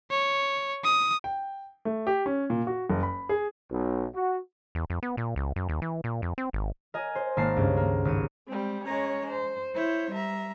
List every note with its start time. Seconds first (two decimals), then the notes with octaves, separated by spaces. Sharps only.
0.10 C#5
0.84 D#6
1.24 G5
1.85 A3
2.07 G4
2.26 C#4
2.50 A#2
2.67 F#4
2.90 F#1
3.03 B5
3.29 G#4
3.71 B1
4.15 F#4
4.75 E2
4.90 F2
5.03 B3
5.17 A#2
5.36 C#2
5.56 F#2
5.69 D#2
5.82 E3
6.04 A#2
6.22 F2
6.38 C4
6.53 G#1
6.94 A#4 D#5 G#5
7.15 C5
7.37 G#1 A#3 A5 C7
7.56 C#2 G2
7.77 A#3
8.05 G#1 C#7 D#7
8.47 G3 G#3 C4
8.85 G#3 C#4 C#5 A#5
9.30 C5
9.74 E4 C5 C#5 G6
10.11 G3 E5 A#5